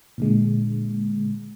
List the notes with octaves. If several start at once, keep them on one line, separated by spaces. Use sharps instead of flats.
A#2 D3 G#3